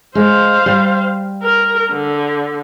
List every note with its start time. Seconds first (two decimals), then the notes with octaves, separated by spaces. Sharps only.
0.15 G#3 C5 F5
0.66 G3
1.43 A#4
1.91 D3